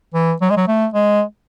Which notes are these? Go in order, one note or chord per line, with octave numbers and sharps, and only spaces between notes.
E3
F#3
G#3
F#3
A3
G#3